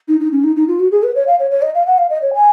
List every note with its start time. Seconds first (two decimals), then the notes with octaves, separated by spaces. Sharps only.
0.08 D#4
0.20 D#4
0.32 C#4
0.44 D#4
0.56 D#4
0.68 F4
0.80 F#4
0.92 G#4
1.03 B4
1.15 C#5
1.27 F5
1.39 C#5
1.51 C#5
1.62 D#5
1.75 F5
1.86 F#5
1.98 F5
2.10 D#5
2.22 C#5
2.34 G#5